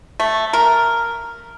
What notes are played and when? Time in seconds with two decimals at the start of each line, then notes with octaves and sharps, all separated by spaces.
0.20 A3
0.53 A#4